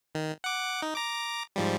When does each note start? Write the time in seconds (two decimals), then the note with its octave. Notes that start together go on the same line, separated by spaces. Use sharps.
0.15 D#3
0.44 F#5 D6
0.82 D#4
0.95 A#5 D6
1.56 G#2 F3 G3